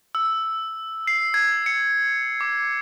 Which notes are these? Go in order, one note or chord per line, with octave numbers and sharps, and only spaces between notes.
E6
C7
G#6
C#7
D6